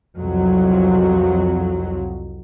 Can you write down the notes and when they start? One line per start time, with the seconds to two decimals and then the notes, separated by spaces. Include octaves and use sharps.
0.18 C2 F2 F#3